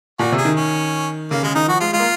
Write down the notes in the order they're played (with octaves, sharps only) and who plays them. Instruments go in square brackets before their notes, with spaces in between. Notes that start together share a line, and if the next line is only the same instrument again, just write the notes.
[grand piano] A#2 [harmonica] F#4
[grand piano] C3
[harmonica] G#4
[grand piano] D#3
[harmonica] C#4
[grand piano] C#3 [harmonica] A#3
[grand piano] C#3 [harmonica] G#3
[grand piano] D#3 [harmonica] D#4
[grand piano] F3 [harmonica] F#4
[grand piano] G#3 [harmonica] F4
[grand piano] G#3 [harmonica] F4
[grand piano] A#3